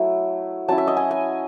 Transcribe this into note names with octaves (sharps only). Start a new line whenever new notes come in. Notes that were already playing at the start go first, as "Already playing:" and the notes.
Already playing: F#3 A3 E4
F#3 C#4 E4 A5
E5
D#5
G#5
G#5